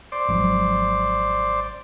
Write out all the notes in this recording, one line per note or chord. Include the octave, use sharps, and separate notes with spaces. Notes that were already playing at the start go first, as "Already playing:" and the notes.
C5 D5
G#1 F3 F#3